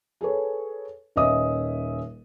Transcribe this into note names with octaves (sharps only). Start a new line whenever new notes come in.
G#4 A4 B4 C#5
D#1 C#4 B4 D#5 E5 D#6